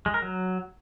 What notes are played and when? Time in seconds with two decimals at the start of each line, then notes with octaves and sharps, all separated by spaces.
0.06 G#3
0.14 A#4
0.22 F#3